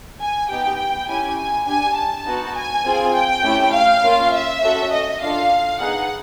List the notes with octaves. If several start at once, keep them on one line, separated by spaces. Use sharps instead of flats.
G#5
B3 D#4 G4 G5
C#4 E4 G4 G#5
G#5
D4 G4 G#5
A5
B3 D#4 F#4
G#5
C4 F4 G#4
G5
A3 C#4 E4 G4
F5
A#3 C#4 F4
E5
C#4 F#4 A4
D#5
D4 F4 A4 F5
B3 D#4 G#4 F#5